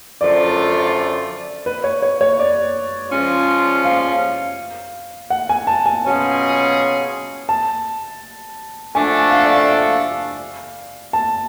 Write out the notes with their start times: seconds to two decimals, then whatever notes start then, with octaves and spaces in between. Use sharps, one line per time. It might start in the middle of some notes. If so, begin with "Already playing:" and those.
0.21 F#2 D3 F3 A3 F4 D5
1.66 B4
1.84 C#5
2.02 C#5
2.21 C#5
2.39 D5
3.12 F3 G#3 C#4 F4
3.84 F5
5.30 F#5
5.49 G#5
5.67 A5
5.86 G#5
6.04 B2 F#3 C#4 F4 G#4
7.49 A5
8.95 F3 A3 D4 F#4 A4 G#5
9.31 F5
9.45 D5
9.58 F5
11.13 A5